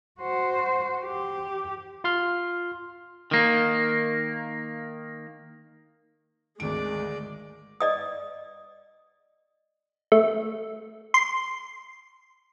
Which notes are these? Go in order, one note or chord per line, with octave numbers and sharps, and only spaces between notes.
F#4 C5
G4
F4 C6 F6
D#3 A#3
G#1 D2 G#3 D5 D7
D5 D#5 D#6
A3
C6